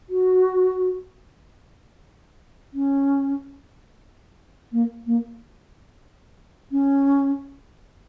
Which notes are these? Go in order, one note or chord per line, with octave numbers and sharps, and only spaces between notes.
F#4
C#4
A#3
A#3
C#4